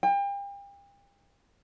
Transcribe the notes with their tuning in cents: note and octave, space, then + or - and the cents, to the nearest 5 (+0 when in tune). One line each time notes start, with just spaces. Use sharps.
G5 +35